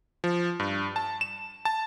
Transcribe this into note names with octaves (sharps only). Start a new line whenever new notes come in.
F3
G2
A5
E7
A5